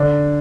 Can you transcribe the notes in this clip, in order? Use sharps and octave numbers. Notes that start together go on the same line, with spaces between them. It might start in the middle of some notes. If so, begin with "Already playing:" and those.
Already playing: D3 D4